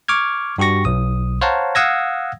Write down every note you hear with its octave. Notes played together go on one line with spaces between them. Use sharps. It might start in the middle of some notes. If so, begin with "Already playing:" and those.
C#6 D6 F6 G#6
G2 F#4 G4 C#6 A#6
B1 D#6
C5 C#5 F5 F#5 A5 A#5
F5 F#5 D#6 E6 G#6 A#6